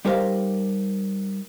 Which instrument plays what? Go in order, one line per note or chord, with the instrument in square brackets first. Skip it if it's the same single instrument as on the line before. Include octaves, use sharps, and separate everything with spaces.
[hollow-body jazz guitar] G3 D#4 G4 A#4 C5 F5